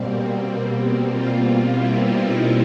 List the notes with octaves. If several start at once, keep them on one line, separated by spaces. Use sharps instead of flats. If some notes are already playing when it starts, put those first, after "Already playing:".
Already playing: B2 G3 A#3 C4
C4
C4
F4
E4
D#4